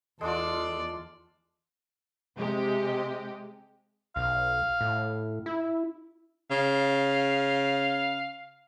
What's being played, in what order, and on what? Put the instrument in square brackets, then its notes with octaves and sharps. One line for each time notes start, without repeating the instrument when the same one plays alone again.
[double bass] E2 [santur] G#3 D4 F4 [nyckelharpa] A4 D5
[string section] C3 G#3 G4 D#5
[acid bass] B1 [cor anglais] F5
[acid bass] A2
E4
[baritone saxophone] C#3 [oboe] F5